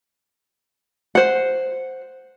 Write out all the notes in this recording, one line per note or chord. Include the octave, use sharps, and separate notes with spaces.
C5 F#5